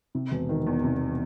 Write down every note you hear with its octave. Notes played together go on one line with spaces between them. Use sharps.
C3
E1
D#3
E2
C3